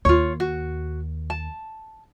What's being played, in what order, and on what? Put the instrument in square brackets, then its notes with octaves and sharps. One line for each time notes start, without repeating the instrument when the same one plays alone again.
[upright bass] D#2 [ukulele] F4 C#5
[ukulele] F#4
A5